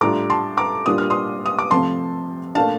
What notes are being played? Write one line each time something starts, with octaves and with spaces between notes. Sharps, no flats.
A2 G3 D4 F4 A#5 D6
A5 C6
A#5 D6
A#2 G3 D4 F4 D#6
F6
C6 D#6
D#6
D6
C3 F3 A3 C4 A5 C6
A#2 A3 D4 F5 A5